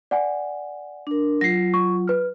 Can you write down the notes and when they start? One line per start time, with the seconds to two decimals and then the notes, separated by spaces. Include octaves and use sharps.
0.11 D5 F#5 G#5
1.07 D4 A#4
1.41 F#3 F4 A#6 C7
1.74 C#6
2.08 B4 F6